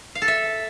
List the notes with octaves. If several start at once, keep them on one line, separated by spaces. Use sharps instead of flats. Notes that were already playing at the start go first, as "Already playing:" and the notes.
F5
A4
E5